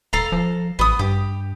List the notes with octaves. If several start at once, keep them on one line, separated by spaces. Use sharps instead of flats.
D#1 A4 F5 A#5
F3
A1 B3 D#6
G2 G4